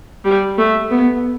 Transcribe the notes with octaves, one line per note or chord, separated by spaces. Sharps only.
G3
A3
B3